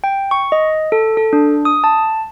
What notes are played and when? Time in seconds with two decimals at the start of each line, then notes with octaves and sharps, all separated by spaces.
0.04 G5
0.31 C#6
0.52 D#5
0.92 A4
1.17 A4
1.33 D4
1.65 D#6
1.84 A5